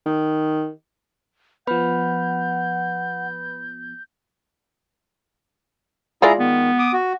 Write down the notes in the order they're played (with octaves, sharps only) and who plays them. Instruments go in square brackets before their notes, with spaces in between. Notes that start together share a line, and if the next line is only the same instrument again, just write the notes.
[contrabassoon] D#3
[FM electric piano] F3 B3 [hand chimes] B4 B5 [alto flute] F#5 [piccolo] G6
[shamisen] G#3 F4 D5 [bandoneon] E4 G#4 A#5
[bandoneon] D#3 [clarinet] B3
[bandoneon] D6 D#6
F#4